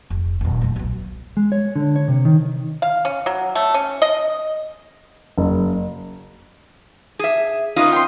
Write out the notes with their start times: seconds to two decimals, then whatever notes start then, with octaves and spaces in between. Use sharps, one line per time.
0.10 F1
0.41 D#1 F#2
0.61 D#3 A3
0.76 B1 B2
1.37 G#3
1.52 C#5
1.76 D3
1.96 C#5
2.08 C3
2.25 D#3
2.82 F5
3.05 C#4
3.26 F#3
3.55 A3
3.74 C#4
4.02 D#5
5.38 F#1
7.19 G#4 E5
7.76 C#4 D#4 F4 B4 D#5 D#6
7.92 G5 C6